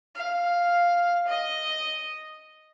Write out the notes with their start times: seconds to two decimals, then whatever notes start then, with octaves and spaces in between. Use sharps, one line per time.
0.15 F5
1.27 D#5